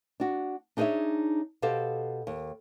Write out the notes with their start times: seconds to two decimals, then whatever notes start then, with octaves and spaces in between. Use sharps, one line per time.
0.20 D4 F#4
0.77 D4 D#4 G#4 B4 C#5 E5
1.62 B2 G4 A4 C5 F5
2.27 D#2